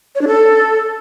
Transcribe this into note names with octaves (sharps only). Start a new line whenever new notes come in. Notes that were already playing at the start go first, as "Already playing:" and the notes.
C#5
D4
A4